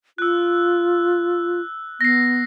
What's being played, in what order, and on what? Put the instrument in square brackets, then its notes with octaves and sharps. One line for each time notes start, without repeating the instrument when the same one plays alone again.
[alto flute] F4 [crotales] E6 F#6
[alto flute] B3 [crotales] A#6 C7